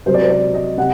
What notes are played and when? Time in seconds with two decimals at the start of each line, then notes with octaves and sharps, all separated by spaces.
0.06 C3 F#3 C5
0.14 D5
0.22 C5
0.30 D5
0.54 D#5
0.78 C3 F#5